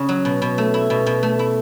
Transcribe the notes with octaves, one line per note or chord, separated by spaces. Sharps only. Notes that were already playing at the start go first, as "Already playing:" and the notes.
Already playing: C#3 C#4
F#3
B2
B2
A3
E4
B2
B2
A3
E4